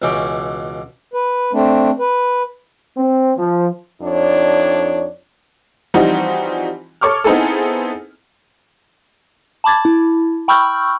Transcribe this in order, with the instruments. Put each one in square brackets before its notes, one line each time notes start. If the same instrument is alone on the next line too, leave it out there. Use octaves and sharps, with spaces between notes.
[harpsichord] C#2 B2 E3 C#4 G5 D6
[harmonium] B4
A3 C4 D4
B4
[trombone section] C4
F3
[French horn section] F2 D4 D#4 C#5 D5
[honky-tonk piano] E3 F3 G3 C4 D#4 F#4
A4 C#5 C#6 D6 F6
B3 C4 D#4 E4 G#4 A4
[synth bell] A5 B5 D6 G#6 A6
E4
G5 B5 C#6 E6 F6 G6